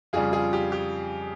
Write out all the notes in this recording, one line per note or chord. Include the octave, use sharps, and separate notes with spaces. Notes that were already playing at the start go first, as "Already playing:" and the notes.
F2 C#3 G3 F4 G#4
F4 G#4
G4
G4